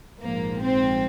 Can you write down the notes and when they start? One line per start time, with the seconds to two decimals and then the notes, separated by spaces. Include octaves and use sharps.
0.22 A#1 G#2 F3 A#3
0.61 C4